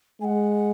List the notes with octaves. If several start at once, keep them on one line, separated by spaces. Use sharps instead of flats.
G#3 F#5 G#5